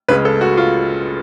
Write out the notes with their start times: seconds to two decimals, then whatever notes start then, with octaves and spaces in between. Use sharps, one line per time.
0.08 C#2 C#3 G#3 B4
0.25 A4
0.41 F#4
0.57 F4